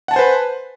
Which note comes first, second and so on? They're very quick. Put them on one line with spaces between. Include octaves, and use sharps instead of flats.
F#5 A5 G#5 C5 B4